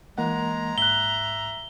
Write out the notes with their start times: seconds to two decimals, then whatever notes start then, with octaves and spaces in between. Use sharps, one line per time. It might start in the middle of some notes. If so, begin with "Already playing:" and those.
0.18 E3 G#3 A#3 F#5 A#5
0.78 G#2 E5 F#6 G7